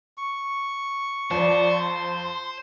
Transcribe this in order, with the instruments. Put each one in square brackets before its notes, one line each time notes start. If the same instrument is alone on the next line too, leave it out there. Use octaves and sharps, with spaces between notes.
[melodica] C#6
[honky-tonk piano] F2 [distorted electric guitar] C5 [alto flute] D5
[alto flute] C6